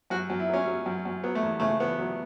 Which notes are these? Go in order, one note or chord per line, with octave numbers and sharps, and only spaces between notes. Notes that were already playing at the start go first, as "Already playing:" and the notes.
F#2 F#4
F#2
E4
F#3 C#4
F#3
F#2
F#2
F#3 B3
A3
E2
C#3 A3
E2 B3
F#3